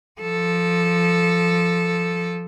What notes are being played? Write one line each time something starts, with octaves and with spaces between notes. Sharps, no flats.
F3 A4